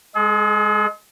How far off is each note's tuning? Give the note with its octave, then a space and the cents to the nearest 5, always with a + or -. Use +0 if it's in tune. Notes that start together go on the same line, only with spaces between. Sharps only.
G#3 +0 G#4 +45